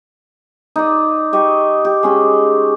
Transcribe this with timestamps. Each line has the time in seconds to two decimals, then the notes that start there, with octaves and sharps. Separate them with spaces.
0.76 D#4 D5
1.33 G4 D#5 C#6
1.85 G4
2.03 G#3 C#4 G4